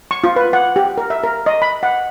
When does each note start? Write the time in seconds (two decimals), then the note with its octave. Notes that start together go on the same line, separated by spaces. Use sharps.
0.11 C#6
0.24 F4
0.36 B4
0.53 F#5
0.76 G4
0.98 A#4
1.10 E5
1.24 A#4
1.46 D#5
1.62 B5
1.83 F#5